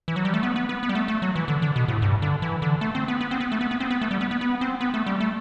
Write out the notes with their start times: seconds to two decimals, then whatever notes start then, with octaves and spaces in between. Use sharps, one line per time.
0.08 E3
0.16 F#3
0.25 G3
0.34 A3
0.43 B3
0.56 B3
0.69 B3
0.83 B3
0.89 G3
0.95 A3
1.08 A3
1.22 F#3
1.36 E3
1.48 D3
1.62 D3
1.76 B2
1.88 A2
2.02 G2
2.22 D3
2.42 E3
2.62 D3
2.81 A3
2.95 C4
3.08 B3
3.21 B3
3.31 C4
3.41 B3
3.52 A3
3.61 B3
3.71 B3
3.80 C4
3.90 B3
4.01 A3
4.11 G3
4.21 B3
4.31 B3
4.41 B3
4.61 C4
4.81 B3
4.94 A3
5.06 G3
5.20 A3